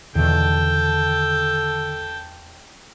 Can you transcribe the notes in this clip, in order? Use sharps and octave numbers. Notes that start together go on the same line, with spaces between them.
E2 B2 D3 D#3 A4 G5 A5